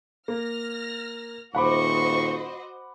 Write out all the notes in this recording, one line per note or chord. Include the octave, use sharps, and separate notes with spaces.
A#3 F6 A#6
D#1 F#4 C5 D#5 F#5 B5 C#6 D6